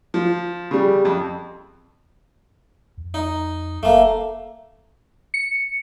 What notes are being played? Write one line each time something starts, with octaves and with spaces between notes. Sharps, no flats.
F3
C#3 G3
F2
F2
D#4
E1 A3 A#3
C#7